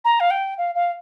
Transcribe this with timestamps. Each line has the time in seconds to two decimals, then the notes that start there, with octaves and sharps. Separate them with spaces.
0.04 A#5
0.20 F5
0.30 G5
0.58 F5
0.75 F5